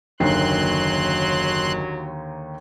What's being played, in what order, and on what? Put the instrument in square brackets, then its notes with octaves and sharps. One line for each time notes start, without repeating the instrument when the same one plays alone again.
[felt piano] F#1 C7 [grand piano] D#2 D3 D#3 [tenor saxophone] F#3 [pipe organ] C6 F#6